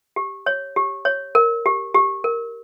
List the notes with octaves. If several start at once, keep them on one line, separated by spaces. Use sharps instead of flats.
G4
C#5
G4
C#5
A#4
G4
G4
A#4